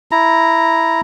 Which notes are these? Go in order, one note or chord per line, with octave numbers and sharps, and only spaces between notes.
E4 A#5